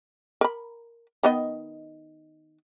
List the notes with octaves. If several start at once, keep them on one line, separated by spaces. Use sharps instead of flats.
A#4 B5
D#3 B3 D#5